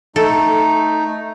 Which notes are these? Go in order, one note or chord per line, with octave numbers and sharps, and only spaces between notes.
A3 D#4 A4